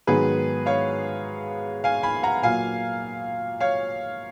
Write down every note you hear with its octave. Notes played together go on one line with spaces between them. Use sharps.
G#2 D#3 F#3 B3 G#4 B4
C#5 F5
F5 G#5
G#5 B5
F#5 A#5
A#2 F#3 A#3 F5 G#5
C#5 F5